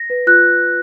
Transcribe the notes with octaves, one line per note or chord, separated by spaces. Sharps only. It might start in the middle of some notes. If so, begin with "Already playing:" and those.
Already playing: A#6
B4
F4 F#6